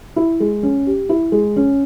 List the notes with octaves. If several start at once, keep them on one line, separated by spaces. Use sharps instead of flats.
E4
G#3
C#4
G4
E4
G#3
C#4